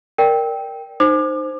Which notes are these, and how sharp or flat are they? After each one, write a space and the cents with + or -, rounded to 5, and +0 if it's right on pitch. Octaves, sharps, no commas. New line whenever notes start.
A#4 +0 D5 +0 G5 +0
D#4 -25 C5 +0 D6 +35